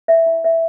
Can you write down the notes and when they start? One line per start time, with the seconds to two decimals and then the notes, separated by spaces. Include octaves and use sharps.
0.08 E5
0.26 E4
0.44 E5